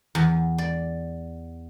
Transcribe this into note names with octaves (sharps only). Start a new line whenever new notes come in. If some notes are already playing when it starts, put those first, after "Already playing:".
E2
D5